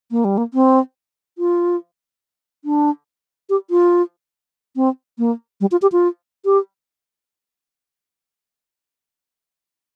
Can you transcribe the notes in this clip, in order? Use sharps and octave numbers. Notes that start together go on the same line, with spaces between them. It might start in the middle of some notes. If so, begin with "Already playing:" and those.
A#3
G3
A#3
C4
F4
D4
G4
F4
C4
A#3
G3
F4
G4
F4
G4